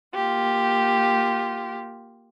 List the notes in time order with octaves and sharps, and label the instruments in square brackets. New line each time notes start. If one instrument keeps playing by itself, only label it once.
[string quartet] A#3 F4 G4